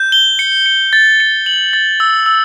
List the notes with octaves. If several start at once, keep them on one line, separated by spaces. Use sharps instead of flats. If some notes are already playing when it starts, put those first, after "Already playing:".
Already playing: G6
G7
C#7
C#7
A6
C#7
F#7
A6
E6
E6